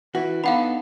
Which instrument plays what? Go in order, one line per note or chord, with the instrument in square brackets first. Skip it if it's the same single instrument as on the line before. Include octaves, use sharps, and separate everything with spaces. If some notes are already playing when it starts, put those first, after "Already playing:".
[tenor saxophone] E3 [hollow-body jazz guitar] F#4
[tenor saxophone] B3 [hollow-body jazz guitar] D4 D#4 A4 [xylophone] F5 F#5 B5